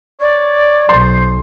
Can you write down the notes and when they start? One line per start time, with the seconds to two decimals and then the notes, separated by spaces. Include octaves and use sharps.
0.21 C#5 D5
0.89 B1 C5 C6